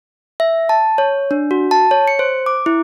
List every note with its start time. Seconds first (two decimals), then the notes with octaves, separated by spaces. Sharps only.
0.40 E5
0.69 A5
0.98 C#5
1.31 D4
1.51 F#4
1.71 A5
1.91 C#5
2.08 C#7
2.19 C5
2.46 D6
2.66 E4